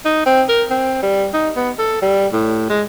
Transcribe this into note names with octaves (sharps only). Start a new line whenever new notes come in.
D#4
C4
A#4
C4
G3
D#4
B3
A4
G3
A2
G#3